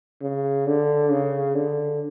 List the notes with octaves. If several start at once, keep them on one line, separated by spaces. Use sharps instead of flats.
C#3
D3
C#3
D3